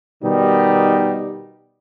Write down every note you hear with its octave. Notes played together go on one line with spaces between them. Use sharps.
B2 D#3 G3 D#4